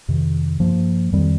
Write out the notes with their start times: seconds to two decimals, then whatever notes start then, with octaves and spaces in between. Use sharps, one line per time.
0.08 F2 C3 D#3
0.60 G2 F3 A#3
1.12 F2 D#3 G3 C4